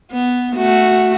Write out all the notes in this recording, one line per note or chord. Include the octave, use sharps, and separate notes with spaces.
B3
A3 F#4